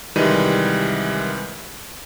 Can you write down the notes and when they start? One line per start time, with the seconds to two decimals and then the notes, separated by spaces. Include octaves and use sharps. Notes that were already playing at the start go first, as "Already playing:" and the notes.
0.16 C2 D#3 E3 G3 G#3 D#7